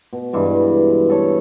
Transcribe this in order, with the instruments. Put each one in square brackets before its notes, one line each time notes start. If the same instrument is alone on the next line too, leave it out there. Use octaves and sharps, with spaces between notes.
[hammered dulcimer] B2
G2 E3 G#3
A4 C#5